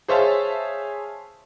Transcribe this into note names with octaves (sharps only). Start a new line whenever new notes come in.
G#4 C5 C#5 E5 F5 A5